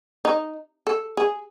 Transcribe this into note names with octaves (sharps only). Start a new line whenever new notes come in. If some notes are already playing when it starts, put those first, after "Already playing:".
D#4
A4
G#4